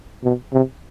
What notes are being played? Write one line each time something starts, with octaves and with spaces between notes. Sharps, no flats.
B2
C3